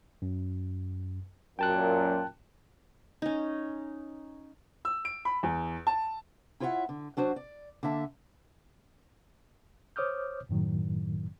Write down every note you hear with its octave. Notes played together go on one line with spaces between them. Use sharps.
F#2
F#2 A#2 G5 A5 F#6
C#4 D#4
E6
D7
B5
E2
A5
E4 F4 C#5 D#5 E5 F#5
D3
F#3 D4 F#4 C5
D5
D3 A#3 E5 A5
C5 C#5 D6 D#6 F6 G6
F#2 A2 D#3 F#3